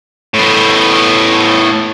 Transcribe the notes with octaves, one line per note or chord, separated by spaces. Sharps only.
A2 B3